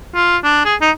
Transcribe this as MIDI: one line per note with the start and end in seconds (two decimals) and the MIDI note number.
0.15 0.37 65
0.44 0.62 62
0.65 0.75 68
0.81 0.91 63